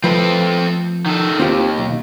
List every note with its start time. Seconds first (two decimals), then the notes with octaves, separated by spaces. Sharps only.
0.04 F3 A3 C4 A4 B4
1.06 D#3 A4
1.40 D#2 C4 F4 G4
1.78 B1